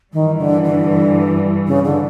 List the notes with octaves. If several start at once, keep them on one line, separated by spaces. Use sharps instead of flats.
G2 D#3 E3 G3
D3
D3
C#3
D3